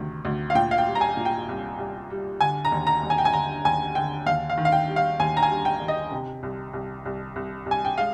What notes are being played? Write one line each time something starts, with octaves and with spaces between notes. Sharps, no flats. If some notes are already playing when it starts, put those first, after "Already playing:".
Already playing: D2 C3 D#3
D2
F5
A#2 G5
F5
G5
G3
A#5
G#5
A#2
G5
C2
C2
G3
D3 G#5
A#5
D#2
A#5
D#2
G#5
G5
G#5
D3 A#5
D#2 G#5
D3 G5
D#2 F5
F5
D#3
F5
G5
G3
F5
D#2 G#5
A#5
G#5
G3
G5
D#2
D#5
C3
C2
C2
C2
C2
C2 G#5
G5
G#3 F5